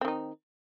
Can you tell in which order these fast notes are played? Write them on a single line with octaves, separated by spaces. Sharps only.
C4 D#3 D#4